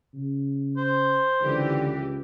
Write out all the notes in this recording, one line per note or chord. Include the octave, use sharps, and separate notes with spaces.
C#3
C5
C#2 D3 E3 G4